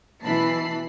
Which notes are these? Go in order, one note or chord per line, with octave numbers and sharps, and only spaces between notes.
B2 E3 A5 B5 C7